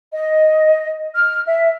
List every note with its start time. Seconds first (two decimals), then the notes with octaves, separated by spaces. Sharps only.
0.14 D#5
1.14 F6
1.46 E5